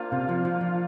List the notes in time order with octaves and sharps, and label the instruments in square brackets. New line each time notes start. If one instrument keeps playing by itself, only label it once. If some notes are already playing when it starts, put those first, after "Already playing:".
Already playing: [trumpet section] A#3 D4 F4 C5 F5
[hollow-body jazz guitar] C3
F3
F3
F3